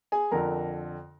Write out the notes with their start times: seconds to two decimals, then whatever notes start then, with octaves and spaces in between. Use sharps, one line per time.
0.12 G#4 G#5
0.31 F2 D3 F3 A#4 A#5